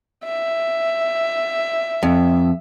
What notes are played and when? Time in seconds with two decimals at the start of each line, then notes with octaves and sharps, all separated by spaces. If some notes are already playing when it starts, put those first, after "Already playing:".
0.24 E5
2.03 F2